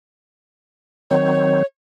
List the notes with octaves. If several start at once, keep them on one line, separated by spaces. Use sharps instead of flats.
D#3 F#3 C4 C#5